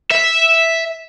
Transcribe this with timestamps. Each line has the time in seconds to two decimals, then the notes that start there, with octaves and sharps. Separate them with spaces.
0.11 E5